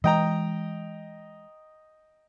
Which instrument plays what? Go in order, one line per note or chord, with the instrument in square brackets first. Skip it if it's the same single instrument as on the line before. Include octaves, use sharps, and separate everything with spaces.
[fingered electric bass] E3 G#3 [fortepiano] D#5 G5 A#5